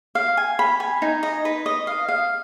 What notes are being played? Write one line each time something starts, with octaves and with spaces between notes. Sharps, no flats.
F5
G#5
B5
G#5
D#4
D#5
B4
D#5
F5
F5